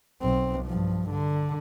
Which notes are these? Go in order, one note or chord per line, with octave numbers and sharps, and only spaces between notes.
B1 C4
G2 F3
D3